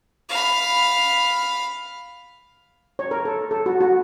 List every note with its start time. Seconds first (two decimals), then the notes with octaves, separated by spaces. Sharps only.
0.29 F5 B5
2.99 C#5
3.11 A#4
3.25 A4
3.51 A4
3.66 F#4
3.81 F#4